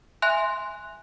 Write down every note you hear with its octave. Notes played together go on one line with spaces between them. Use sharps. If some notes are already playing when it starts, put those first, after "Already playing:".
E5 G#5 C6 F#6